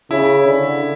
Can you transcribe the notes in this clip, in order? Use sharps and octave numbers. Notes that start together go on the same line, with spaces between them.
C#3 E4
D3